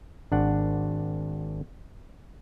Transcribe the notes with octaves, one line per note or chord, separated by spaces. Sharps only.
G#1 D4 F#5